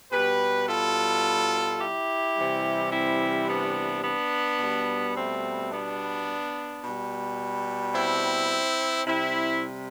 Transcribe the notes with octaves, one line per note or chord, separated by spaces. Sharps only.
B2 G3 G4 B4
F4 A4
E4 G4
C3 E3 G3
C4 E4
B3 D4
B3 D4
B2 G3
A3 C4
B3 D4
B2 G3
C4 E4
C3 G3 C4 E4